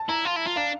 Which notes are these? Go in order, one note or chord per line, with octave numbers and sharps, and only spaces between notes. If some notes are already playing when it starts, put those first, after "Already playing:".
Already playing: A5
E4 A#5
F4
E4
F4
D4 F5